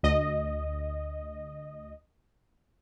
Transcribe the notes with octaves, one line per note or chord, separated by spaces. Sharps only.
D2 D#5